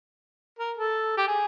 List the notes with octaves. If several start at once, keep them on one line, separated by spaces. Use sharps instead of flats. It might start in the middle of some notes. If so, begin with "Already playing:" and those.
A#4
A4
G4
G#4